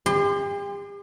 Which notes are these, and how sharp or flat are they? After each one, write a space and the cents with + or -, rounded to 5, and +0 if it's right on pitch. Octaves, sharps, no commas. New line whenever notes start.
G4 +40 C6 -15